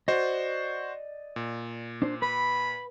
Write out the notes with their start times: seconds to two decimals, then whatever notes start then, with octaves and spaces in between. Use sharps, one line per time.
0.08 F#4 C5 D5 D#5
1.36 A#2
2.02 D4 C5
2.22 B4 B5